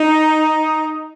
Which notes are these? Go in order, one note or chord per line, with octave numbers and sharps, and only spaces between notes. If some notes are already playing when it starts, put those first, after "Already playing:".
Already playing: D#4